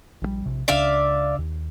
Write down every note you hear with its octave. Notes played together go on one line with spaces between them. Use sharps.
A#1 C#3 G3
A#1 C3
C#2 C#3 D4 D5 E5 F5
D#2